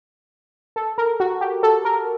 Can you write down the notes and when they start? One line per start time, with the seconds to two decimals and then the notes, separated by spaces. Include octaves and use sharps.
0.76 A4
0.98 A#4
1.20 F#4
1.41 G4
1.63 A4
1.85 A#4